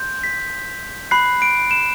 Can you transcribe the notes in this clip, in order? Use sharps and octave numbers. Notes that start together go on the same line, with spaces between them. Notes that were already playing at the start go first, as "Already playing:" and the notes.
Already playing: C6 G6
B6
B5 F#6 C7
D7
E7